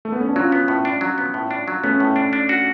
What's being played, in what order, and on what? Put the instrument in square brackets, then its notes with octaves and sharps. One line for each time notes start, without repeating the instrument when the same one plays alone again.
[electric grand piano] A3
B3
C#4
D4
[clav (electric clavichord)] F#3 [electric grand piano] C#4 F4
[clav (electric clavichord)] B3
A2
D4
F#3
B3
A2
D4
F#3
[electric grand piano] A3 C#4 [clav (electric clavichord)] B3
[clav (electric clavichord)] A2
D4
D4
F#4